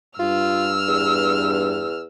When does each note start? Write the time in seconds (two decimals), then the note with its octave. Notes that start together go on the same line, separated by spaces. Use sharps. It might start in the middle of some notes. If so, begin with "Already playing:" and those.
0.19 G2 F4 E6 F6
0.88 E2